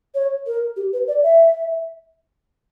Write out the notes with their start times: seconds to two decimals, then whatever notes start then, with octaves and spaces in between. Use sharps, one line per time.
0.14 C#5
0.46 A#4
0.76 G4
0.93 B4
1.08 D5
1.23 E5